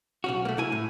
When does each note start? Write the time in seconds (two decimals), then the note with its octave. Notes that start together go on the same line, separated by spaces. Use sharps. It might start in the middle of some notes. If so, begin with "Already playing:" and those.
0.24 B1 C#4 F#4
0.45 A3 A#3
0.57 C2 E4 G#5
0.72 A2